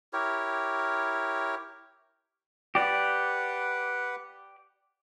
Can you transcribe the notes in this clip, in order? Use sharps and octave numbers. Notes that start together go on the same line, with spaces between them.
E4 G4 A#4 C#5
G4 B4 D5 F#5